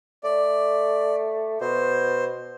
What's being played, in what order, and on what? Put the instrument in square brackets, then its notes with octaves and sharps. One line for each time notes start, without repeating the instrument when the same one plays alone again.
[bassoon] A3 [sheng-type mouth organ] D5
[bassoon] B2 [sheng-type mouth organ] C5